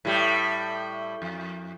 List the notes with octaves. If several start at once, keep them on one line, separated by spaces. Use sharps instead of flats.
A2 G3
F2